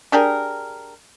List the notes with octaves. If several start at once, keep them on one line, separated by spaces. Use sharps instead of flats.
D4 G4 G#4 A#4